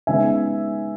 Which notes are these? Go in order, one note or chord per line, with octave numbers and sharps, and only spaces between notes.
C#3 G#3 B3 D#4 E5 G#5